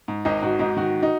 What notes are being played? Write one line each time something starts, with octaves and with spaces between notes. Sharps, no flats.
G#2
G#1 D#4
G#2 F#4
G#2 D#4
D#3 F#4
D#4